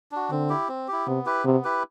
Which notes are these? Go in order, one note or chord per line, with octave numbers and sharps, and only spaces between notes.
D4 F#4
D3 C4
E4 G4
C4
E4 G4
C3 B3
E4 G4 B4
C3 B3
E4 G4 B4